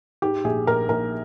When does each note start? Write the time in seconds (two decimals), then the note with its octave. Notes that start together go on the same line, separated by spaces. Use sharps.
0.22 G#2 G4
0.44 A#1 G#4
0.67 A#1 A#4
0.89 A#1 A#4